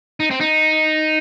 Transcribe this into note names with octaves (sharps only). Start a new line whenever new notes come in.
D#4
C4
D#4